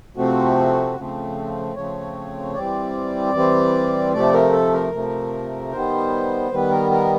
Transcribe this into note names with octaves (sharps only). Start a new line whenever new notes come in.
C3 F3 A3 C4 F#4
C#3 F3 A3 C4
C#3 F3 A3 C4 C#5
E3 G3 C4 D5
E3 G3 C4
C3 F3 A3 D5
A#4
A4
A#4
C3 F3 A3
D#3 G3 B3 C5
D#3 G3 B3 B4
A#4
A#4